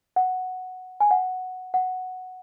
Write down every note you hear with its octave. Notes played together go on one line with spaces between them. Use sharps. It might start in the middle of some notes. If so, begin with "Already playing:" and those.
F#5
G#5
F#5
F#5